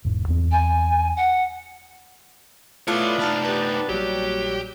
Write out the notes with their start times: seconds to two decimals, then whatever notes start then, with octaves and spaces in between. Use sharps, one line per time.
0.05 E1 G#2
0.28 E2 C4
0.51 G#5
1.16 F#5
2.88 A3 B3 D4 E4 F4 B4 C#5
3.19 A3 D#4 A5 F6
3.44 G4 B4 A5
3.89 A#1 F#3 G3 G4